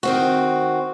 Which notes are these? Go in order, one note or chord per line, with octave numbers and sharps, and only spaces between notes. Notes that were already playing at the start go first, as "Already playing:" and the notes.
D#3 C4 F#4